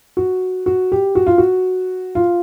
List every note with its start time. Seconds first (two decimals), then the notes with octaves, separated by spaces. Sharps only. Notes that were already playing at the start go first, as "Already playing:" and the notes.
0.17 F#4
0.66 F#4
0.92 G4
1.15 F#4
1.27 F4
1.38 F#4
2.15 F4